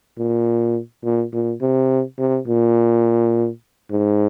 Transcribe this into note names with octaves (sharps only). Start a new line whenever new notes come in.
A#2
A#2
A#2
C3
C3
A#2
G#2